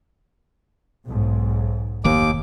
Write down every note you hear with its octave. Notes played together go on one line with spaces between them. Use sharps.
B1 G#2
F1 D#2 D#3 A#3 D6